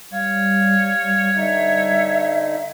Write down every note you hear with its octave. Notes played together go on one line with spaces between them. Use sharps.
G3 C#5 F5
D3 D#4 E5